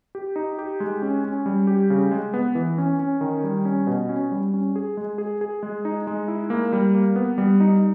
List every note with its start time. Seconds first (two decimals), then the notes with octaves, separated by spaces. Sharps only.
0.15 G4
0.36 D#4
0.59 G4
0.80 G#3
1.02 C#4
1.24 C#4
1.46 G3
1.67 G4
1.90 C#3
2.11 G#3
2.34 B3
2.55 E3
2.78 C#4
2.99 C#4
3.21 D#3
3.44 G3
3.65 C#4
3.87 B2
4.09 C#4
4.31 G3
4.54 C#4
4.76 G#4
4.97 G#3
5.18 G#4
5.41 G#4
5.63 G#3
5.85 D#4
6.07 G#3
6.28 E4
6.50 A#3
6.72 G3
6.95 A#3
7.16 B3
7.38 G3
7.60 D#4